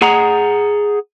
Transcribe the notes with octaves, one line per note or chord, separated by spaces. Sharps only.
G#4 F#5 A#5